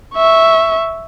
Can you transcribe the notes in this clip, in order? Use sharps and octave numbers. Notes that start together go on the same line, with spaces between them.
E5 C#6